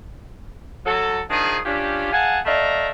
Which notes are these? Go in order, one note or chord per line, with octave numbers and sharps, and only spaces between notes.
F#3 A4
D#3 F3 D4 G#4
C#4 D4 F4 G4
G#4 F5 F#5 G#5 A5
A3 D5 D#5 F5 A#5